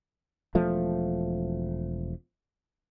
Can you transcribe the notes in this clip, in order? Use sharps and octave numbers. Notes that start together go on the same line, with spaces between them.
E1 F3 A3